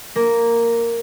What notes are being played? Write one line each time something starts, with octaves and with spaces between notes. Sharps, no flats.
A#3